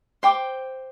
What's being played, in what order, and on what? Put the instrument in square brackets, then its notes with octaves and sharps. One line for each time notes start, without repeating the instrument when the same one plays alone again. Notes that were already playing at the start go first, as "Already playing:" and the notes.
[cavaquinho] C5 G5 D6